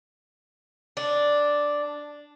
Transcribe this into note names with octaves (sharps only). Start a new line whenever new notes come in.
D4